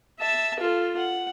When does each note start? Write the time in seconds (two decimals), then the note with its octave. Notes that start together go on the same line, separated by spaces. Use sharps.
0.20 E5 A5
0.60 F4 A4
0.98 F#5